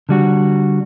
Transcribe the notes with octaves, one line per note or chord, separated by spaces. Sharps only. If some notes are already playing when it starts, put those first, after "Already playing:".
D3 G3 F#4